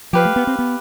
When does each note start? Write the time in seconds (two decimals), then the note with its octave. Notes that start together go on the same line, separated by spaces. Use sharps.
0.13 F3 G4 B4 F5
0.25 A3
0.36 B3
0.47 C4
0.59 B3